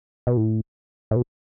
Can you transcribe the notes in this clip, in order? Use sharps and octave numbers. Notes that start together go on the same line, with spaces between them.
B2
A2
A2
B2